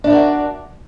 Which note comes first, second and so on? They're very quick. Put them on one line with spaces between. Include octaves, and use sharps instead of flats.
D4 E4 A#4 F#4 D5